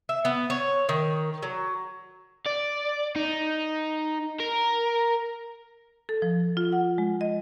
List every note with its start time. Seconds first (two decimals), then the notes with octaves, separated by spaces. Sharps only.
0.09 E5
0.25 B3
0.50 C#5
0.89 D#3
1.43 F#3
2.46 D5
3.16 D#4
4.40 A#4
6.09 A4
6.22 F3
6.57 F4
6.72 F#5
6.98 G#3
7.21 D#5